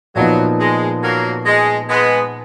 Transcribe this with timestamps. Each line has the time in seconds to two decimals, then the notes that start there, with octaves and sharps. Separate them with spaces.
0.15 A#2 F3 F#3 B3 D#4
0.59 G#3
1.02 F#3 A#3
1.46 G#3
1.89 G#3 B3